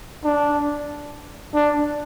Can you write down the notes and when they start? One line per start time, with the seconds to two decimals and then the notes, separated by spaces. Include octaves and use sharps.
0.24 D4
1.54 D4